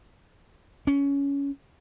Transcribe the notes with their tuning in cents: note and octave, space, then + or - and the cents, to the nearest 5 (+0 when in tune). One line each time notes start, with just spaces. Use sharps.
C#4 +15